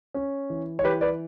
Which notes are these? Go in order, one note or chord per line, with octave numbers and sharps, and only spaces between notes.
C#4
E3
C#5
E3 G4 B4
B4 D5